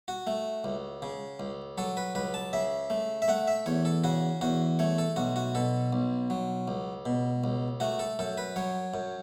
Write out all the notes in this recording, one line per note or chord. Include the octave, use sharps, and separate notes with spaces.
F#4
A3
C#2
C#3
C#2
F#3 A4
B4
C#2 B4
A5
C#3 E5
A3
E5
A3 F#5
E5
E2 C#5
A4
C#3 F#4
E2 F#4
A3 C#5
A4
B1 F#4
F#4
B2 A4
B1
F#3
C#2
B2
C#2
A3 F#4
A4
F#2 A4
B4
F#3 C#5
F#2